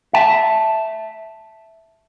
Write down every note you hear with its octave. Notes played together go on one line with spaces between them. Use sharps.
E5 A5